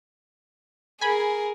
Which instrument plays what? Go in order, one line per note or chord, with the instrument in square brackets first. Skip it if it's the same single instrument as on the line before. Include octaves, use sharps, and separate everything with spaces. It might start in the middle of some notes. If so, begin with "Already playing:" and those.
[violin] G#4 A#4 [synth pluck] G#5 B5